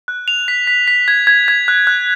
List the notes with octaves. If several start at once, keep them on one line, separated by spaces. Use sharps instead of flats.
F#6
F7
B6
B6
B6
G#6
G#6
G#6
F#6
F#6